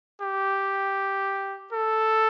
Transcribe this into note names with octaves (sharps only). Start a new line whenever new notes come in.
G4
A4